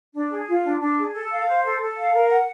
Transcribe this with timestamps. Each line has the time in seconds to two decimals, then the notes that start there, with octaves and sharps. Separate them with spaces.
0.14 D4
0.30 G#4
0.48 F4
0.64 D4
0.80 D4
0.97 G#4
1.13 A4
1.30 F5
1.48 C5
1.64 A4
1.81 A4
1.97 F5
2.14 A#4
2.30 F#5